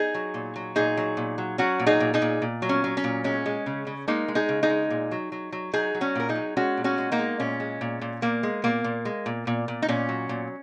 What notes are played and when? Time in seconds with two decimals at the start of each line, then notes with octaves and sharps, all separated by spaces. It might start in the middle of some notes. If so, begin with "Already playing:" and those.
Already playing: D#4 G#4
0.14 F#3
0.34 A#2
0.56 F#3
0.76 A#2 D#4 G#4
0.97 F#3
1.17 A#2
1.38 F#3
1.58 F#3 C#4 F#4
1.80 A#2
1.86 D#4 G#4
2.00 A#2
2.14 D#4 G#4
2.22 A#2
2.42 A#2
2.62 F#3
2.69 C#4
2.84 F#3
2.97 C#4
3.04 A#2
3.24 G#3 C#4
3.46 G#3
3.66 C#3
3.87 C#3
4.08 G#3 A#3 D#4
4.28 G#3
4.35 D#4 G#4
4.49 C#3
4.63 D#4 G#4
4.70 G#3
4.90 A#2
5.11 F#3
5.32 F#3
5.52 F#3
5.73 F#3 D#4 G#4
5.94 F#3
6.01 C#4 F#4
6.16 A#2 A#4
6.29 D#4 G#4
6.35 F#3
6.57 G#3 C#4 F#4
6.77 A#2
6.84 C#4 F#4
6.98 G#3
7.12 A#3 D#4
7.19 G#3
7.40 A#2 C#4
7.60 G#3
7.81 A#2
8.02 A#2
8.22 A#2 A#3
8.43 G#3
8.64 A#2 A#3
8.84 A#2
9.05 G#3
9.26 A#2
9.47 A#2
9.68 A#2
9.82 D#4
9.88 A#2 C#4
10.09 F#3
10.29 A#2